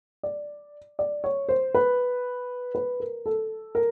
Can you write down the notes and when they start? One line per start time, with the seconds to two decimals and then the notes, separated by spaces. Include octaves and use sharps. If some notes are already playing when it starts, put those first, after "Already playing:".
0.23 D5
0.99 D5
1.24 C#5
1.49 C5
1.75 B4
2.75 B4
3.00 A#4
3.26 A4
3.75 A#4